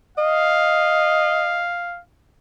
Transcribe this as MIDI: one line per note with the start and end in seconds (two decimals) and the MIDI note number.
0.18 1.67 75
0.18 2.01 77